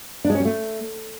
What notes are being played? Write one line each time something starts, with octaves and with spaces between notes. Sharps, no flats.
D4
G#3
C#4
G3
A3